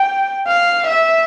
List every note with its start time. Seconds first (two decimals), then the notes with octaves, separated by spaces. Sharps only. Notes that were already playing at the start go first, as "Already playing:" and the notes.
Already playing: G5
0.48 F5
0.87 E5